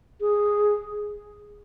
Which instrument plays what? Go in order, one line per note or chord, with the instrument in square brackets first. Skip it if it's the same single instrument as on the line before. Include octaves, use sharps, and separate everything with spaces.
[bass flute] G#4